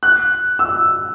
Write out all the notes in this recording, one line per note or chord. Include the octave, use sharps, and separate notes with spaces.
F#6
E6